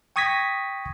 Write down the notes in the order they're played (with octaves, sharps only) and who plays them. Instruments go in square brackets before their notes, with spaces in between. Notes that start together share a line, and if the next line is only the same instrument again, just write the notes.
[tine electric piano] G5 C#6 D#6 G#6 A#6 B6